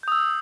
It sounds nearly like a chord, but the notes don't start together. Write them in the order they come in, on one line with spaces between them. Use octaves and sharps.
G6 D#6 E6